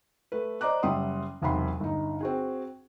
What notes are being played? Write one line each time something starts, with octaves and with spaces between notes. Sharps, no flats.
A3 A4 B4
C5 D5 D#5 A#5 D6 F#6
F#1 G3 E5 F#5 C6 D#6
E1 B1 C3 F#5 B5 C6
G1 D#4
C4 F#4 G#4